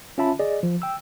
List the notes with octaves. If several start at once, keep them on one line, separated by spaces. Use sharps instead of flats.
C#4 F4 E5 A5 B5
G#4 D5 D#5
F3
G5 E6